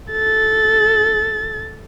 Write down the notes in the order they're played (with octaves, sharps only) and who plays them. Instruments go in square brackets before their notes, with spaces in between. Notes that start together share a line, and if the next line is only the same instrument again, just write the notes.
[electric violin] A4 A6